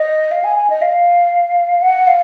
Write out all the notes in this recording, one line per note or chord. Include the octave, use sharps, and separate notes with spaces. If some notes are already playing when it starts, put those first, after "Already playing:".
Already playing: D#5
F5
G#5
G#5
D#5
F5
F#5
F5